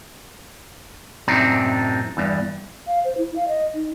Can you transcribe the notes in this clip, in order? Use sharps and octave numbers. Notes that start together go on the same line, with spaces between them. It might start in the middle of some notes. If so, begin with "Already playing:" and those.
F#2 A2 C3 C4 D4 D#4
E2 G2
F5
C5
E4
F5
D#5
D#4